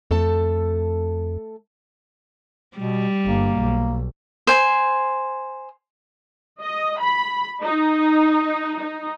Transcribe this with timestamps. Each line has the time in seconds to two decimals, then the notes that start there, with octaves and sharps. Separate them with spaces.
0.11 F2 A3 A4 A5
2.77 B2 G3
3.26 G1 A#3
3.59 B1
4.47 C5 G#5
6.61 D#5
7.01 B5
7.62 D#4
8.77 D#4